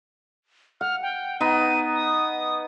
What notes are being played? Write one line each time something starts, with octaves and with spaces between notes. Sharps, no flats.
F#5 F6
G5
B3 D#4 D#7
D#6